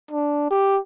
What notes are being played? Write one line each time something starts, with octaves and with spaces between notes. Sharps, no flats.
D4
G4